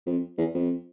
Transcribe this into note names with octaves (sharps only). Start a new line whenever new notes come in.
F2
E2
F2